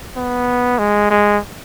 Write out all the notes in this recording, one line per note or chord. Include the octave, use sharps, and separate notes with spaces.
B3
G#3
G#3